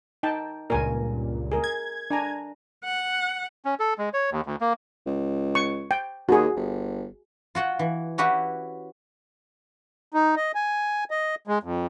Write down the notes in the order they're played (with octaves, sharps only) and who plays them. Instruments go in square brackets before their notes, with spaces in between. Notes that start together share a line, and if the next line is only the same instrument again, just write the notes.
[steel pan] D#4 G5 A5
[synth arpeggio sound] C#2 G2 A#2 [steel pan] A#4 G#5
[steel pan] G#4 A#4
[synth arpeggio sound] G#6
[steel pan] D4 G#5 A#5
[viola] F#5
[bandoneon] C#4
A4
G#3
C#5
D#2
D2
A#3
[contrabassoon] C#2
[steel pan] C#6
G5
[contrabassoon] D#2 [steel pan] F#4 G#4
[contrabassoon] G1
[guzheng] F4 F#4 F#5 G5
E3
C#4 E4 F#4 G4 B4 C#5
[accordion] D#4
D#5
G#5
D#5
G#3
F2